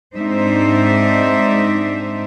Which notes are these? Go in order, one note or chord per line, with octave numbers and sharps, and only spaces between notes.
G#2 C4 D4 D#4 C5 E5